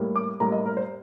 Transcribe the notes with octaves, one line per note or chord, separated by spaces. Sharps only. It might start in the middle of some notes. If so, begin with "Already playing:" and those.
Already playing: A2 G3 A#3
D6
A2 G3 A#3 A#5
D#5
A#4
C5